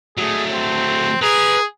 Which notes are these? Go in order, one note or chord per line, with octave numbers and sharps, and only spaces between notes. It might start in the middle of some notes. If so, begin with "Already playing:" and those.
F#3 A3 G#4
C4
G#4 B4 A#5